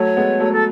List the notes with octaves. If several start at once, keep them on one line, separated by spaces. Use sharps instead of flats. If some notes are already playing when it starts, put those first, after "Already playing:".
Already playing: F#3 A3 C#5
G#3 B3
F#3 A3
A4